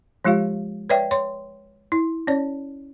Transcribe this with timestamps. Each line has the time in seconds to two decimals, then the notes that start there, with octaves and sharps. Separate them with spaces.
0.24 F3 G#3 F4 G4 F5
0.90 B4 C#5 D5 E5 G5
1.11 C#5 C6
1.92 E4
2.27 C#4 C#5 D5